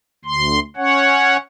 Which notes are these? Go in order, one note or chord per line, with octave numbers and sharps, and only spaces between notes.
D2 C6
C#4 C#5 F#5